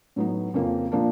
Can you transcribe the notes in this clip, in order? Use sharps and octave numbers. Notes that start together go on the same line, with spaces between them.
A2 F#3 B3 D#4
F2 C#3 F3 A#3
A#2 F3 A#3 D4